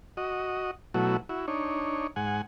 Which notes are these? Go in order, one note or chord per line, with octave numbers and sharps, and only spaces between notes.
F#4 D#5
B2 F#3 A3 E4 F#4
E4 F#4
D4 D#4 C#5
G#2 F#5 G#5